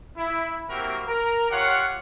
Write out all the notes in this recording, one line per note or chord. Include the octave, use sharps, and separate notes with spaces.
E4
A#3 C4 E4 F#4 G4 A#4
A#4 A#5
F4 G4 C#5 F5 F#5